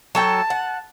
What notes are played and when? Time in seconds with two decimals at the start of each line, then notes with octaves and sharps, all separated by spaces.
0.15 F#3 A4 G5 A5
0.50 F#5